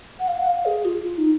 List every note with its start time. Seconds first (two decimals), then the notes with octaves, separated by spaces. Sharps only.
0.19 F#5
0.28 F5
0.40 F#5
0.47 F5
0.66 G#4
0.85 F4
1.04 F4
1.18 D#4